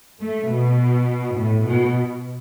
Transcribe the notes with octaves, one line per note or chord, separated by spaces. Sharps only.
A3
B2
A2
B2